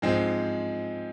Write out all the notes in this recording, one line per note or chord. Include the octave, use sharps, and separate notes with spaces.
G#2 F3 G#3 C4